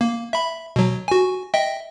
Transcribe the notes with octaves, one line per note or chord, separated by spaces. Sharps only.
A#3
E5 B5
B2 F#3
F#4 G#5
D#5 E5 G5